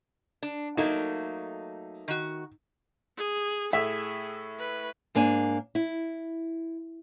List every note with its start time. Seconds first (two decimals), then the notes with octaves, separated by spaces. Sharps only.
0.43 D4
0.77 F#3 A3 A#3 D#4
2.08 D#3 F#4
3.17 G#4
3.73 A2 G#4 E5 B6
4.59 B4
5.15 G#2 A#3 D4 G#5
5.75 E4